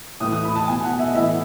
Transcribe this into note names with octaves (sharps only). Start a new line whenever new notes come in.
A2 E3 D#6
D#6
B5
A5
B2 G#5
F#5
E5
D#5
A2 E3 E5